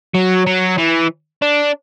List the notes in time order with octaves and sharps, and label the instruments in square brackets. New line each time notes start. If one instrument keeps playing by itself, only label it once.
[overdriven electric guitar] F#3
F#3
E3
D4